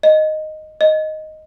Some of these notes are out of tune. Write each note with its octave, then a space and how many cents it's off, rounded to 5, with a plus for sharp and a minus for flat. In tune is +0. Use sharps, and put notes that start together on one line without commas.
D#5 -5
D#5 +0